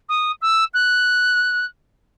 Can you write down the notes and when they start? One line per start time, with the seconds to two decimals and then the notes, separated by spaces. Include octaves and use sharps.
0.09 D#6
0.41 E6
0.74 F#6